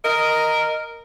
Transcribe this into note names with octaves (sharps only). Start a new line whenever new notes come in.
A#4 D#5